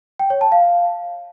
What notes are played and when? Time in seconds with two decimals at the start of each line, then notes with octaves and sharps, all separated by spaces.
0.19 G5
0.30 C#5
0.41 A5
0.52 F5